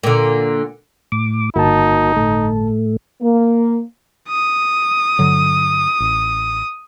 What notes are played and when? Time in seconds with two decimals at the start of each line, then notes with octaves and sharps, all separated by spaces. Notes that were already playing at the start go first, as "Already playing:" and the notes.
0.03 A#2 D3
1.12 A2 D6
1.56 G1 A#3 D#4 F#4 A5
2.16 A2 A3
3.22 A#3
4.29 D#6
5.19 G2 D3 F#3
6.00 A1